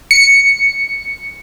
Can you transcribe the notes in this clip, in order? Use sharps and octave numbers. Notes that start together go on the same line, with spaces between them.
C#7